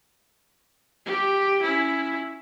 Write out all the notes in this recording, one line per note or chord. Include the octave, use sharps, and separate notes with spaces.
G4
C#4 E4